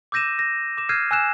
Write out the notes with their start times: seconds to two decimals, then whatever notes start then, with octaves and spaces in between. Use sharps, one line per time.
0.12 D6 E6 G6 A#6 D#7 E7
0.39 A#6
0.77 D6 E7
0.89 E6 F6 G6 G#6 C7 D#7
1.11 G#5 E6 F#6 E7